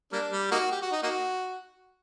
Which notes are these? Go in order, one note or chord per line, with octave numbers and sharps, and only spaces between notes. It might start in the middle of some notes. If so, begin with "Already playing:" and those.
G3 A#3 D4
G3
A#3 D#4 F#4
G4
F#4
D#4
A#3 D#4 F#4